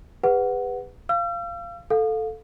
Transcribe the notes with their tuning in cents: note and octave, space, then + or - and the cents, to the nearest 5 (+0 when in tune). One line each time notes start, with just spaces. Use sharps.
G#4 -40 B4 +10 F#5 +0
F5 -15 E6 +40
A4 +0 F5 +20